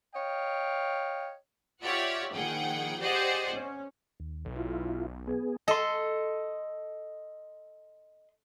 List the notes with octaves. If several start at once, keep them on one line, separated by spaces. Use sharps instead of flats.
C#5 D#5 F5 G5
F4 G4 C#5 D5 E5 F#5
A#1 D#3 G#4 F#5 G5
G4 G#4 C5 D5 D#5 F#5
C#4
D#2
B1
E4 F4
B3 G#4
A4 D#5 C6